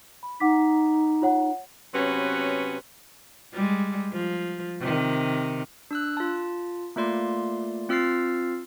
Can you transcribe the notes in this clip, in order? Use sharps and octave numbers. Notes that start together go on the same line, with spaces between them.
B5
D#4 F#5 D6 B6
F4 C#5 F#5
C3 F#3 B3 C#4 B4
G3 G#3
F3
C3 D#3
D4 E6 F#6
F4 A5
A3 A#3 F4 D5 C6
C4 F4 E6 F6 A6 C7